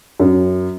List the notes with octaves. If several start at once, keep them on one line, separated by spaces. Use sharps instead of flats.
F#2